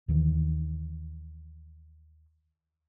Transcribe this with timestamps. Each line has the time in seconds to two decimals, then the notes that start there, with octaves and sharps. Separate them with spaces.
0.08 D#2 D#3 E3